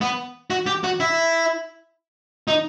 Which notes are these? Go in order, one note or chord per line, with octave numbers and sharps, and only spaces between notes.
B3
F#4
G4
F#4
E4
D#4